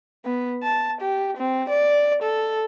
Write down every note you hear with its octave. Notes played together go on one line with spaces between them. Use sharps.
B3
A5
G4
C4
D5
A4